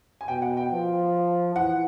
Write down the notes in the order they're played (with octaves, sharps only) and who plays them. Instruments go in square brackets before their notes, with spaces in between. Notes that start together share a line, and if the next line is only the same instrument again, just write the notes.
[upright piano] G#5
[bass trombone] B2 [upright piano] G5
[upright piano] F#5
G5
[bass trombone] F3
[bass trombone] E3 [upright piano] F#5